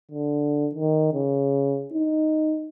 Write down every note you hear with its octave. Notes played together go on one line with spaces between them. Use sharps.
D3
D#3
C#3
D#4